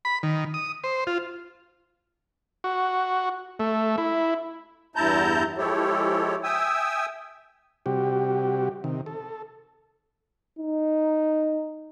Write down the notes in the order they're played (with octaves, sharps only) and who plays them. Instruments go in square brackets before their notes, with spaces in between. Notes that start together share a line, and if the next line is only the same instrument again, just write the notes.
[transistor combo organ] B5
D#3
D#6
C5
F4
F#4
A3
E4
[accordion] E2 G2 E4 A5 A#5 G6
F3 G#3 E4 G4 A4 C#5
E5 G5 G#5 D#6 E6
[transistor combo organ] C3 G3 F#4 G4
C3 D#3
A4
[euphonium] D#4